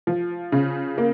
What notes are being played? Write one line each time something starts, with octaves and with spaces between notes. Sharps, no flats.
F3
C#3
A#3